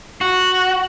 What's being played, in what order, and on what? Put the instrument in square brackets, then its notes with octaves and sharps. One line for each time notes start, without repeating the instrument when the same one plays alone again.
[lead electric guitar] F#4